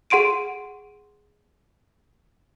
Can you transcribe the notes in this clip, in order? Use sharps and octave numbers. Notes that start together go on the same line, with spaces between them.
G#4 F#5 C6 D7 D#7